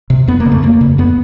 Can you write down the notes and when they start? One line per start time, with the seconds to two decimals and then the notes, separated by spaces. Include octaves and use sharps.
0.10 C3
0.28 F2 B3
0.40 A#3
0.46 C#3
0.52 A3
0.63 F2 A#3
0.81 C#3
0.98 F2 B3